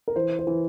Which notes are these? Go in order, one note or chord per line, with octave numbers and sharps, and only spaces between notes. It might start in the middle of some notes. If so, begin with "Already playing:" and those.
A#4
E3 C5
C5
E3